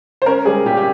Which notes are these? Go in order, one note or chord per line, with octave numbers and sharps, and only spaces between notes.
C5
C#4 A#4
G3 G#4
A#2 G4
G4